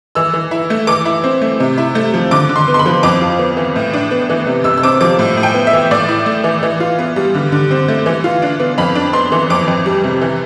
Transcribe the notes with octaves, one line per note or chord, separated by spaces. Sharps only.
E3 E6
E3
E4
A3
E3 D6
E4
C4
A3
C3
E4
A3
F3
D3 D6
D3
C6
B3
C6
B5
F3
F2 D6
F4
B3
E3
A2
D4
B3
E3
C3
C3 E6
E6
C4 D6
F3 D6
A2
A2
G5
B3
E5
E3
A2 D5
E4
A3
E3
E3
F4
B3
G3
D3
D3
C4
A3
E3
F4
D4
B3
F2 B5
D4
B3 C6
E3
F2 D6
F2
G3
C3
E3